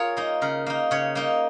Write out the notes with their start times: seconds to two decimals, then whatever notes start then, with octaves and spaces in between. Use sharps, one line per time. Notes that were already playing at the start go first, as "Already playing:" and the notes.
Already playing: F4 G#4 A#4 C#5
0.17 A#3 D#4
0.42 C#3 A#4
0.66 A#3 D#4
0.91 C#3 C#5
1.15 A#3 D#4